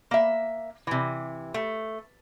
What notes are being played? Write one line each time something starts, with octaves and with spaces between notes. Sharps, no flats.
A#3 E5
C3 E3
A3